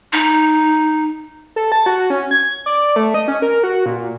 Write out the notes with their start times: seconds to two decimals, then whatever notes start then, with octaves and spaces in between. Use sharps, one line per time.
0.13 D#4
1.56 A4
1.72 A5
1.86 F#4
2.10 C#4
2.31 G#6
2.66 D5
2.96 A3
3.14 D#5
3.28 C#4
3.42 A#4
3.63 F#4
3.86 A#2